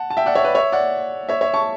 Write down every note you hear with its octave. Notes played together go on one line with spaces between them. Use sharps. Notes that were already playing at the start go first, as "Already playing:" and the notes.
Already playing: F#5 A5
A5
E5 G5
D5 F#5
C#5 E5
B4 D5
C#5 E5
D5 F#5
C#5 E5
C#5 E5
A5 C#6